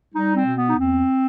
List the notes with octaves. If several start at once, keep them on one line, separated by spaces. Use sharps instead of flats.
G3 D#4
C4
B2
B3
D#4
E2 C4